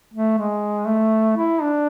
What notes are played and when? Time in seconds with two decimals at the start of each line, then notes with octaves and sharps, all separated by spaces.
0.14 A3
0.38 G#3
0.88 A3
1.37 E4
1.62 D4